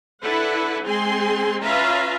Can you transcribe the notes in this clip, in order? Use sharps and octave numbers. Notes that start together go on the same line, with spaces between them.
D4 E4 A4 B4 F#5
G#3 C4 G#4 G#5 C6
C#4 F4 B4 E5 F5 A#5